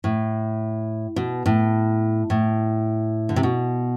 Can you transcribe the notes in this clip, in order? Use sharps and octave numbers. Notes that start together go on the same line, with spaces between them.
A2
B2
A2
A2
D3
C3
B2